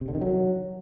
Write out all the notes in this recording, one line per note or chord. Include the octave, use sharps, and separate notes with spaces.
C3
D3
D#3
F#3